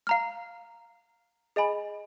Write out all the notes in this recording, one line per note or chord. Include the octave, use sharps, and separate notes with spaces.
F5 A#5 F6
G#4 D#5 G#5 B5